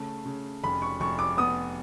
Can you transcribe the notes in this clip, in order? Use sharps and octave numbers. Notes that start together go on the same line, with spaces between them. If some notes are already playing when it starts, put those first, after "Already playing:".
Already playing: C#3 A3 A5
C#3
F1 B5
C#6
F1 C#6
D6
B3 D#6